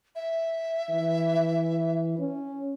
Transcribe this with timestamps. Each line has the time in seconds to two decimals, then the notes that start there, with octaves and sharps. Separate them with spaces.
0.15 E5
0.90 E3
2.19 C#4